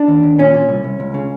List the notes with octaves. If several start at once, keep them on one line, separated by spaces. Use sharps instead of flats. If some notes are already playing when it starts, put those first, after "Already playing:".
Already playing: D4
D#2
D#2
A#2 C#4
A#2
C2
C2
C#2
C#3